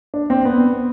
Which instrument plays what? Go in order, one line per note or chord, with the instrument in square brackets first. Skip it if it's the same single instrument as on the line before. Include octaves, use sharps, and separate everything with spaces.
[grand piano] D4
C4
B3